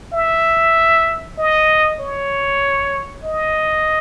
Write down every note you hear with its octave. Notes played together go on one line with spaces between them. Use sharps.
E5
D#5
C#5
D#5